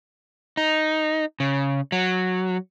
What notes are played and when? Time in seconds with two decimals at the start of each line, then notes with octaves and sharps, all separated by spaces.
0.57 D#4
1.40 C#3
1.92 F#3